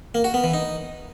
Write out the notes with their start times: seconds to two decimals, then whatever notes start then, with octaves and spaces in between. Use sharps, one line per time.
0.15 A#3
0.24 F#4
0.34 B3
0.44 E3
0.54 D#4